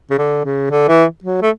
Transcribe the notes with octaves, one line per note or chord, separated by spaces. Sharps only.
C#3
D3
C#3
D3
E3
F#3
A3